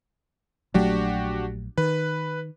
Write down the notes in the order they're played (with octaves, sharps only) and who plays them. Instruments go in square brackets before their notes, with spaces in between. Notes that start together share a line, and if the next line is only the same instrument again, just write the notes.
[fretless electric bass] A#1 F#3 A3 [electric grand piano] D4 F#4 G4
[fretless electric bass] D#3 [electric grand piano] B4